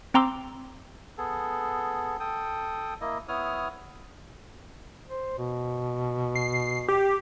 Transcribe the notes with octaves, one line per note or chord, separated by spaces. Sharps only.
C4 G5 A#5 C6 D6 E6
B3 G#4 A4
A4 G5 D#6
A#3 E4 D#5
B3 E4 C#5 D#6 F6
C5
B2
C7
G4